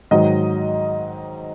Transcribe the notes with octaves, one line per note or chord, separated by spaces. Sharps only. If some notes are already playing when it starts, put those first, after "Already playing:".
G#2 D#3 F#3 D#5